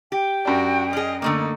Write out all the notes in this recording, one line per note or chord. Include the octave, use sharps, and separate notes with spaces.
G4 G5
F#2 D4 F#4
C#4 G#4 D#5
D3 A3 A#3 D#4